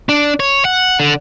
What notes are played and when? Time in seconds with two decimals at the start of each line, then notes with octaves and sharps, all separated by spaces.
0.09 D4
0.40 C#5
0.65 F#5
1.00 D3